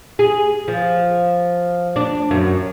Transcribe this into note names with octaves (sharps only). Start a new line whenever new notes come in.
G#4
F3
D4
F#2